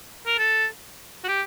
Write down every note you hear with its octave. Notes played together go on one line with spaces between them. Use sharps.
A#4
A4
F#4
G4